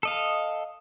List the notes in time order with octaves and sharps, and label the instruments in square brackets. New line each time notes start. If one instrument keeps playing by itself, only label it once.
[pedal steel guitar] A4 D#5 F5